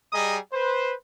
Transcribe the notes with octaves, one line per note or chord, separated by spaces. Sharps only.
G3 G#4 D#5 A#5 D#6
B4 C5